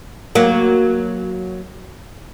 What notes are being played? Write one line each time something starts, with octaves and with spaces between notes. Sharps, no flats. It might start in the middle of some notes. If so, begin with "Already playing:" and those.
F#3 A#3